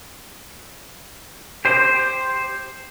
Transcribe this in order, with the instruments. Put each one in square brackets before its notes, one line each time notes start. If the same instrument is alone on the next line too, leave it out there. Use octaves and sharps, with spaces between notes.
[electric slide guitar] G4 C5